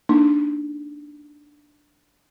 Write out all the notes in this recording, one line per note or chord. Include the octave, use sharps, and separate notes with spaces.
A#3 D4 D#4